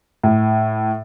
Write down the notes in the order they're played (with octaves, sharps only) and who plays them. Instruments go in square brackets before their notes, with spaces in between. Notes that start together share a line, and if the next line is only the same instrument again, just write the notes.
[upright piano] A2